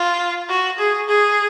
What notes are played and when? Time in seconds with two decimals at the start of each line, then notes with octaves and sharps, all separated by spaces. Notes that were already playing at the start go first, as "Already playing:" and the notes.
Already playing: F4
0.49 F#4
0.79 G#4
1.08 G#4